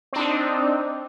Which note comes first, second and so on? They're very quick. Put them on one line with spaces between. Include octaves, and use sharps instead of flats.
C4 D4 D#4